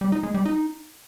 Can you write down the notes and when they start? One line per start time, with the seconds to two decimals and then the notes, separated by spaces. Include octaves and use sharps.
0.01 G3
0.12 D#4
0.23 G#3
0.34 G3
0.46 D#4